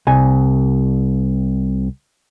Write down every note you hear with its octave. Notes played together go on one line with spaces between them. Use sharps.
C2 G#5